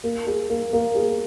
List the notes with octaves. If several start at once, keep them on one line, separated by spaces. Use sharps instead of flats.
A#3
G#4
A#3
A#3
G#4